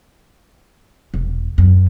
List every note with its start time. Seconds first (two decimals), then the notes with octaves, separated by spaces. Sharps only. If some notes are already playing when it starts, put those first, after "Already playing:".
1.14 E1
1.58 F#2